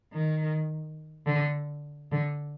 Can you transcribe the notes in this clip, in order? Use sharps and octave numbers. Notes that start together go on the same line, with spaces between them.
D#3
D3
D3